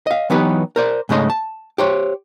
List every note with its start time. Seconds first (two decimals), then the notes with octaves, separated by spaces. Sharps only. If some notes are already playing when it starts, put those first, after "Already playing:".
0.07 D#5 F5
0.30 E3 F#3 B3 D#4 G4 B4
0.76 A#4 C5 D5
1.09 G#2 C#3 A3 D#5 C6
1.30 A5
1.78 G4 C5 C#5